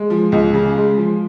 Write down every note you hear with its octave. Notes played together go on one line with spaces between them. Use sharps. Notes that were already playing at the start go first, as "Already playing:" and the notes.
Already playing: G#3
F3
C#2
C#3
G#3
F3